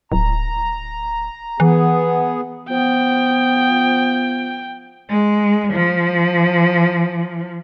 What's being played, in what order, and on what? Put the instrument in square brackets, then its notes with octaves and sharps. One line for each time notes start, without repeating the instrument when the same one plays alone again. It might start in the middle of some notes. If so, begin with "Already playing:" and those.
[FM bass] D1 [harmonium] A#5
[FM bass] E3 [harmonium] B3 G#4
[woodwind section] F3 B3 [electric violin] G5
[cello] G#3
F3